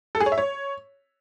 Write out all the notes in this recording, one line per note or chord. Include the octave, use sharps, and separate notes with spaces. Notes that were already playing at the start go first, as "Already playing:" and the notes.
A4
G#4
C#5
E5
C#5